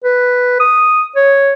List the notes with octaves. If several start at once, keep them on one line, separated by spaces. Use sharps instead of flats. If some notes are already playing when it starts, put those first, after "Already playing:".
B4
D#6
C#5